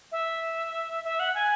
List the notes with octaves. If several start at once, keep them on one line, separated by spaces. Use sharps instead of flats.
E5
E5
F#5
G#5